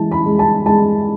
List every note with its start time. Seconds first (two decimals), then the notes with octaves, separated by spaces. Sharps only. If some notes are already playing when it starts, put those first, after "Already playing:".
Already playing: E3 G#3 A5
0.12 B5
0.26 G#3
0.39 A5
0.66 G#3 A5